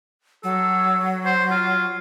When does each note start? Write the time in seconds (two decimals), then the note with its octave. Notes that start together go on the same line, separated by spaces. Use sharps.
0.44 F#3 A4
1.25 C5
1.51 F4